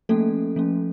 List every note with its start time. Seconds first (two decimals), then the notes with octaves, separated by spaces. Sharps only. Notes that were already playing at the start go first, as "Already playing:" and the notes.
0.09 F3 A3 A#3 C#4 A4
0.56 F3 A3 C#4